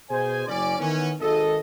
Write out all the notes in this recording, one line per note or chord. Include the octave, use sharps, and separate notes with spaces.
B2 G#4 C5 G#5
F#1 C#4 D5
D#3 E3 B3 C#4
G#1 A4 D#5